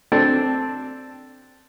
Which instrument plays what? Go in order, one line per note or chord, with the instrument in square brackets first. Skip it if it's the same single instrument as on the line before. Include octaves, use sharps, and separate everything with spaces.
[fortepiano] C4 D4 A4